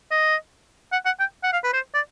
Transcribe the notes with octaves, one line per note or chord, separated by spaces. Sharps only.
D#5
F#5
F#5
G5
F#5
F5
B4
C5
D5